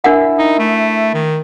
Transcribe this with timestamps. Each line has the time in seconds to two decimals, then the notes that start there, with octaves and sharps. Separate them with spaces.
0.04 D4 E4 A#4 F#5
0.38 D#4
0.59 A3
1.14 D#3